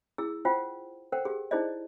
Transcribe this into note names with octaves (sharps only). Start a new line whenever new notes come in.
E4 G#4 E6
F4 C5 F#5 G5
A4 A#4 C5 F#5 G5
G4 G#4
D#4 E4 G#4 C5 D5 D#5